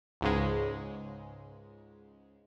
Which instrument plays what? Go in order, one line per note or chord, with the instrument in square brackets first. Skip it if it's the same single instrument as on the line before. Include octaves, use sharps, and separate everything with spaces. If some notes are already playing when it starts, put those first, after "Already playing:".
[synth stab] C#2 G#2 C#3 G#3